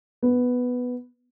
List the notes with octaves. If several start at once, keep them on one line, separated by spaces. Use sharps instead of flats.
B3